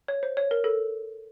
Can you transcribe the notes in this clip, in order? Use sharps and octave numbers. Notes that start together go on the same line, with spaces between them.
C#5
C5
C#5
A#4
A4